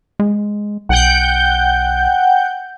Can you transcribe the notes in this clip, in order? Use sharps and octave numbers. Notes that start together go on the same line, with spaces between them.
G#3
B1 F#5 G5 G6